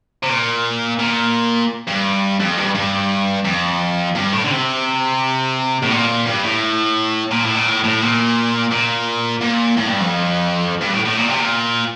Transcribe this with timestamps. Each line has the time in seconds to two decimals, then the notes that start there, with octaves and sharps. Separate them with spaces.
0.23 C3
0.29 A#2
1.00 A#2
1.87 G2
2.40 F2
2.58 G2
2.75 G2
3.45 F2
4.15 G2
4.33 A2
4.44 D3
4.50 C3
5.83 A2
5.91 A#2
6.26 G2
6.43 A2
7.31 A#2
7.43 A2
7.54 A#2
7.66 A2
7.84 A2
8.02 A#2
8.72 A#2
9.41 A#2
9.77 A2
9.88 G2
10.00 F2
10.81 G2
10.94 A2
11.05 A2
11.17 A#2
11.28 C3
11.40 A#2